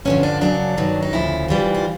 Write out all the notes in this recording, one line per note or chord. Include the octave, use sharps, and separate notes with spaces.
G2 D3 F3 C#4
D4
F#2 C#3 F#3 D4
G2 D#3 F#3
D#4
D2 C#3 F3 E4
G#2 E3 G3 F4
F4